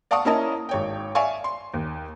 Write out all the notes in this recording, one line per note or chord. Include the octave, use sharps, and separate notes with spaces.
D5 F5 F#5 A5 C#6 D#6
A#3 C#4 E4 A#4 D#5 A5
G#1 C#5 G5
D5 E5 F5 G#5 C#6
C6
D#2